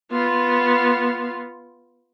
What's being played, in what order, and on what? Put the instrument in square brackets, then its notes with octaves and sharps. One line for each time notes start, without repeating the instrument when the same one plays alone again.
[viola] B3 F4